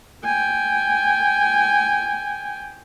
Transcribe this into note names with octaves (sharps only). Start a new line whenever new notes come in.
G5 G#5